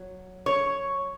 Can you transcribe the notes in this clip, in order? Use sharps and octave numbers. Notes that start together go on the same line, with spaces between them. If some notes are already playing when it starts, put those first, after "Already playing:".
Already playing: F#3
C#5